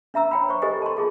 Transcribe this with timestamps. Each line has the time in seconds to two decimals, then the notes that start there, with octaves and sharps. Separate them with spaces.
0.14 D4 E5 A#5 E6
0.31 C#5 G5 B5
0.49 C5 C#6
0.62 G4 A4 A#4 C5 D#5 G#5
0.82 A5 C6
0.97 F4 G#4 A4